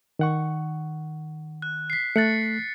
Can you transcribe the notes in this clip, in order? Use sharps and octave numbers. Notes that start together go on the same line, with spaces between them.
D#3 F#5 C#6
F#6
B6 C7
A3 F#6 A6 C#7